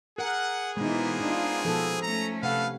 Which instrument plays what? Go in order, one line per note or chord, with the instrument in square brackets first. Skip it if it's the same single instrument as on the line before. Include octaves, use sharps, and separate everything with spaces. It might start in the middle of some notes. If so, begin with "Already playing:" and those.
[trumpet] G#4 [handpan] A#4 [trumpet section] F#5
[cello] B2 E3 [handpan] G#3 D#4 [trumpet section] A#3 B3 C5
[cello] D4 F4 [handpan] D#4
[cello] B2 [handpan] F3 A4
[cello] A3 C#4 [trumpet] A#5
[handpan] C3 F#5 [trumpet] A4 [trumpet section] B4 F5